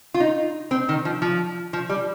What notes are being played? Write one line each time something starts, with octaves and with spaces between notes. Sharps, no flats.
F4
D#4
C4
D#3
F3
F3
F3
G3